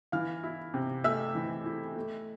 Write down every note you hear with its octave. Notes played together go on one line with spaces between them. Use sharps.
E3 F5 F6
E4
C3
A3 E5 E6
E3
E4
A3